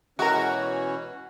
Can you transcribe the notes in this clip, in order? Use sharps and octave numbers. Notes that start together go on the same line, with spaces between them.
B2 E3 G#3 C#4 F#4 A#4